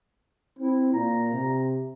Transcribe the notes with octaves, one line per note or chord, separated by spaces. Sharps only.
C4 E4
A#2 A#5
C3